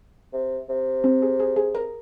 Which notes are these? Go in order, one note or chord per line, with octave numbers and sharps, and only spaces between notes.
C3
C3
C4
G#4
G#4
G#4
A#4